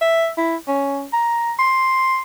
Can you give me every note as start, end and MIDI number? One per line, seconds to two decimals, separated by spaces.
0.01 0.29 76
0.38 0.56 64
0.68 1.05 61
1.13 1.53 82
1.59 2.22 84